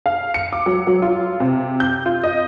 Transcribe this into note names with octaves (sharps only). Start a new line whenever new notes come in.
F5
C#7
D6
F#3
F#3
F4
C3
G6
F4
D#5